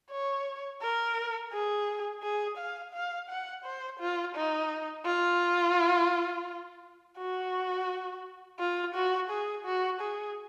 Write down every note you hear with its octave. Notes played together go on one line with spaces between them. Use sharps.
C#5
A#4
G#4
G#4
F5
F5
F#5
C5
F4
D#4
F4
F#4
F4
F#4
G#4
F#4
G#4